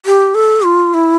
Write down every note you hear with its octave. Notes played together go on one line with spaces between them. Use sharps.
G4
A4
F4
E4